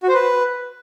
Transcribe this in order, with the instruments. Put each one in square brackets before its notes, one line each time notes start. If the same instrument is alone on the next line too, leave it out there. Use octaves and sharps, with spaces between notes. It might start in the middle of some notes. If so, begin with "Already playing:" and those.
[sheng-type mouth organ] F#4
C5
B4